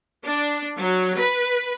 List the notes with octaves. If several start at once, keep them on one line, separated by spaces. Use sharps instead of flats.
D4
F#3
B4